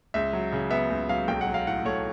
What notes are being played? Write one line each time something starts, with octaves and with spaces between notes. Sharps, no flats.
C#2 E5
F#3
C#3
B3 E5
C#2
F#3 F5
B1 G5
F#5
F#3
F5
A2 F#5
A3 C#5